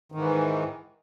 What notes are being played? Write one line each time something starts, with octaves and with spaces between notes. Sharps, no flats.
G#2 D#3 E3